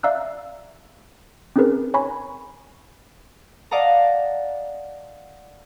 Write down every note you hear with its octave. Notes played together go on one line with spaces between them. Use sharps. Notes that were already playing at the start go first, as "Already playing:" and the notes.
D5 E5 F5 A#5 E6 F#6
C4 C#4 D#4 G#4 A#4 B4
C#5 G#5 A#5 B5 C#6
D5 D#5 F5 F#5 A5 A#5